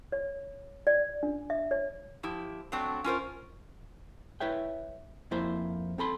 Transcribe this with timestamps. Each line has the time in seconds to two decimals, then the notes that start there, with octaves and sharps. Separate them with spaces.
0.12 C#5
0.87 D5
1.23 D4
1.50 E5
1.71 C#5
2.23 F3 E4 G4
2.72 F#3 A3 C4 D4
3.04 C#4 F4 A#4 C5
4.40 E4 B4 C#5 E5 G5
5.31 F2 A#3 E4 C5
5.98 C4 A4 B5 C6